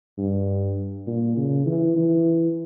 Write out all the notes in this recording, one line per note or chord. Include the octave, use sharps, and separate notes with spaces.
G2
A#2
C#3
E3
E3